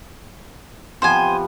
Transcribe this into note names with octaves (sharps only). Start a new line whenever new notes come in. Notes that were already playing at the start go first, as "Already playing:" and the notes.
C3 F3 B3 C5 G#5